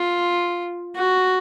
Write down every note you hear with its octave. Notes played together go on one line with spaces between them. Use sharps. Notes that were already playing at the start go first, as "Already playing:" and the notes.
Already playing: F4
F#4